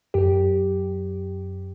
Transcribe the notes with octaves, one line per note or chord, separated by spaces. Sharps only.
F#2 G4